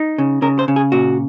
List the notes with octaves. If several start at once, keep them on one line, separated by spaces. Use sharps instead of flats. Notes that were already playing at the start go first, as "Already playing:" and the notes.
Already playing: D#4
C#3
C#3 A#4
C5
C#3
G#4
A#2 F#4